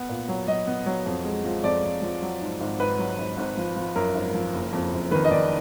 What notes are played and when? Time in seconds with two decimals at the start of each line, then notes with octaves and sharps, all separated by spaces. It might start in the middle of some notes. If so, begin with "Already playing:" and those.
Already playing: B3
0.09 A#2
0.28 F#3
0.47 F#3 D#5
0.67 B3
0.86 F#3
1.06 F2
1.25 G#3
1.44 F3
1.64 F2 D5
1.83 F2
2.02 F3
2.22 F#3
2.41 G#2
2.61 G#1
2.80 G#2 B4
2.99 F#3
3.19 G#1
3.37 G#1
3.57 F3
3.76 F3
3.95 F#2 A#4
4.15 G#1
4.34 F3
4.53 F#1
4.73 F2
4.93 F#1
5.11 D#3 B4
5.24 D#5
5.31 D#3 D5